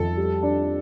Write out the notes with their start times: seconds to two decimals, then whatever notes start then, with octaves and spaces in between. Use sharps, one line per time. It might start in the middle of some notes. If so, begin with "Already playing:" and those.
Already playing: F2 A4
0.17 G3
0.43 D4